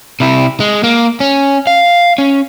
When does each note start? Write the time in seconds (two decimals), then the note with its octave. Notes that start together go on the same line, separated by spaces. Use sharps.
0.20 C3 E4
0.60 G#3
0.84 A#3
1.20 C#4
1.67 F5
2.18 C#4